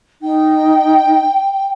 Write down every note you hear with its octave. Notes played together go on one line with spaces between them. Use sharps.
D#4 G5